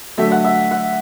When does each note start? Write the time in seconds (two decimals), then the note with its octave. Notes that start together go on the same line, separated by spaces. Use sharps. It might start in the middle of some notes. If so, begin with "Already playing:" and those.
0.18 D3 F#3 A3 E5
0.31 F#5
0.44 E5
0.71 F#5